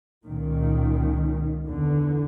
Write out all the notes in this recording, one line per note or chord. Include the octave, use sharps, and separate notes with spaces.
C#2 A#2 D#3
E2 D3